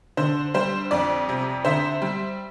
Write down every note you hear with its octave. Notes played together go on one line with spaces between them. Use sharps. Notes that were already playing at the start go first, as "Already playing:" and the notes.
D3 C5
G3 C5
F2 D5
C3
D3 C5 E5
G3